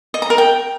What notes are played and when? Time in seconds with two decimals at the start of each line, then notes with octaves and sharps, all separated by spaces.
0.14 D#5
0.22 A#5
0.30 A#4
0.38 G5